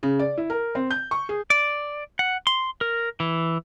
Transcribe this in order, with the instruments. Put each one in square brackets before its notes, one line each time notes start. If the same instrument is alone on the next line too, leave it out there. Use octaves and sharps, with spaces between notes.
[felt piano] C#3
D5
E4
A#4
C4
G6
C#6
G#4
[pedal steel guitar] D5
F#5
C6
A#4
E3